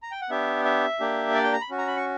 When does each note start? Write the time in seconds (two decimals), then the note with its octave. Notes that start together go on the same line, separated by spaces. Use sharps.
0.03 A#5
0.12 G5
0.21 F#5
0.29 B3 D4 G4 E5
0.65 E5
1.00 A#3 D4 G4
1.34 D5
1.44 G5
1.53 A#5
1.61 B5
1.70 C#4 F#4
1.78 A#5
1.87 B5
1.96 C#6